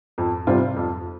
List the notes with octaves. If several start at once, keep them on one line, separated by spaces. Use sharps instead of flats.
F2
C3 G3 C4 F4
F2